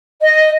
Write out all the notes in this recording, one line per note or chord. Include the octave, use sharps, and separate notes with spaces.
D#5